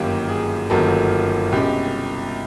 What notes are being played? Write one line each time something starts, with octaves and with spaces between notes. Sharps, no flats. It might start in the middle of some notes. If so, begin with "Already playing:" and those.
Already playing: G1 F#2 D#3 F#3 A#3 G4
G#4
G1 F#2 D#3 F#3 A#3 A4
C2 B2 G#3 C#4 G4